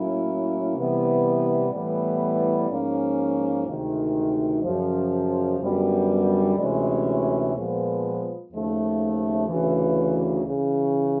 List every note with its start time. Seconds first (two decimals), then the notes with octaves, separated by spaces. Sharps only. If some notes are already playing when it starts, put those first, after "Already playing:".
Already playing: A2 F#3 A#3 C#4 E4
0.75 C3 E3 G3 B3
1.71 A2 E3 G3 B3
2.69 G#2 F3 A#3 C#4
3.65 D2 C3 D#3 G#3
4.62 F#2 C#3 F3
5.60 F#2 D3 G3 B3
6.57 D2 C3 E3 G#3 C#4
7.54 A#2 F3 G#3 B3
8.51 D#2 C#3 F3 A3
9.48 D2 C#3 E3
10.44 C#3 E3